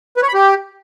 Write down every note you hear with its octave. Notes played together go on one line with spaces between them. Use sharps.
B4
C#5
B5
G4